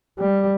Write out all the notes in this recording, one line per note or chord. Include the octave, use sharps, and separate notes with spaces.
G3